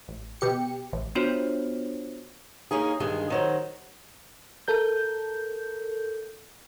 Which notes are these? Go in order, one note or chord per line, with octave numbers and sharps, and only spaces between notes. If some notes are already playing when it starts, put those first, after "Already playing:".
A1
B2 G4 C#7
A1
B3 D4 F4 F#4 C5 C#5
A#3 C#4 D#4 G#4
D2 G2 D#3 G#3 G#4
D#3 F#3 C5
A4 A#4 G6